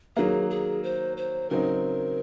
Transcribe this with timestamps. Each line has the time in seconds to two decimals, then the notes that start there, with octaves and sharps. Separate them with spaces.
0.16 D#3 F#3 A#3 G#4
0.50 G#4
0.84 C5
1.17 C5
1.50 C#3 F#3 C4 D#4 A#4